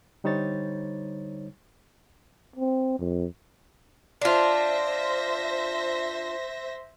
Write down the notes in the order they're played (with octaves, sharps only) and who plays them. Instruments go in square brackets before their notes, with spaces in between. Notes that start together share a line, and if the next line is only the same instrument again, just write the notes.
[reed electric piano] D3 G3 D#4 C5 C#5 A6
[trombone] C4
F2
[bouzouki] D4 F4 [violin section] C5 E5 A#6